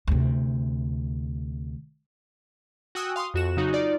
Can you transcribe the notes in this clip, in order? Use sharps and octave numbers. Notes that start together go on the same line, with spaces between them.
D2 C3
F#4 G5 G#5 D#6 E6 F#6
F5 C6 C#6 D#6
F2 F#4 E7
C#3 F#3 D#4 F#4
D#4 F4 D5